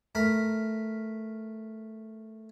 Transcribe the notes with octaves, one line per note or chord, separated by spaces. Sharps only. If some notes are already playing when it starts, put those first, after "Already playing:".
A3 A#4 B5